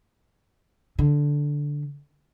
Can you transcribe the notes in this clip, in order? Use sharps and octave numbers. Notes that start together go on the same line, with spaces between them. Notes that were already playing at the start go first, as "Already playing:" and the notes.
D3